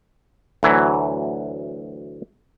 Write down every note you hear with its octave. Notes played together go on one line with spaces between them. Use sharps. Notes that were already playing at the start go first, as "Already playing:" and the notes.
D2 E3 F#3